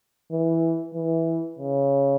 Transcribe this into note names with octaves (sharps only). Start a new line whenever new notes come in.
E3
E3
C#3